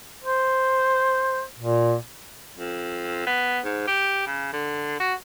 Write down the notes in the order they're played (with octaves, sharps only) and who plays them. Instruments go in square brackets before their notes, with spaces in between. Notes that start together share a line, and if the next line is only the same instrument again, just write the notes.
[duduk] C5
A#2
[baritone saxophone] F2
B3
G#2
G4
C#3
D3
F#4